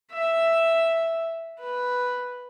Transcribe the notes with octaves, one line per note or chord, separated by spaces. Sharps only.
E5
B4